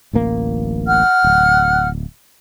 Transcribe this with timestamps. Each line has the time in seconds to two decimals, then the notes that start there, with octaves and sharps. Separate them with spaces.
0.13 D1 A1 A#3
0.87 F#5 F6
1.24 D1